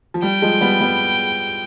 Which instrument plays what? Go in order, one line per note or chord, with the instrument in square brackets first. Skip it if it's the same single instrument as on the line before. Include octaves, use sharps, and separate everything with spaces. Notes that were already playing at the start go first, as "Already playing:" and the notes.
[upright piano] F3
[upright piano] G3 [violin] G5
[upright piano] F3 G#3
G3 B3
G3 B3